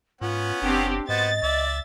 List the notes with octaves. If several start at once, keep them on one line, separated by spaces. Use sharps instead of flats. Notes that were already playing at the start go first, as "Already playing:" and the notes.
G#2 B3 C#4 F4 F#5
F#1 C4 D4 G4
G#2 B3 F#4 C5 D#5 A6
C#2 D5 E5